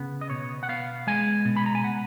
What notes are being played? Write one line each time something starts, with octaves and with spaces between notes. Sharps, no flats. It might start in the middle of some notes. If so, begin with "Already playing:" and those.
Already playing: C#3 B3
D#5
B2 C#5
F#5
B3 F5
G#3 G#5
B2
B5
A#5
G#5
F#5